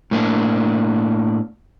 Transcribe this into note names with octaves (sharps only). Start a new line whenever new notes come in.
A2 A#3 D4